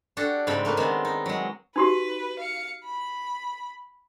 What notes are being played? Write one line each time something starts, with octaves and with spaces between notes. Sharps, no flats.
D4 F#4 G4 A4
G#2 C#3 C4 G5 A5 B5
A3 A#3 B4
D#3 G#3 B3 C4
D#4
F#3 G#3
D#4 F#4 G4 B4
F5 C#7
B5